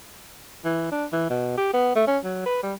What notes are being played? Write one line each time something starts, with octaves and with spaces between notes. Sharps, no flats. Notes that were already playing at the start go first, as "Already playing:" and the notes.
E3
D4
E3
B2
G4
B3
A3
C#4
F#3
B4
G3